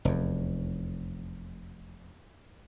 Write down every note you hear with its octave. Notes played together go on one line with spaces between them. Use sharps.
F1 E2